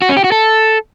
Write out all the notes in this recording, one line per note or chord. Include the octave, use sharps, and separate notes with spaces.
F#4
C#4
G4
F#4
A4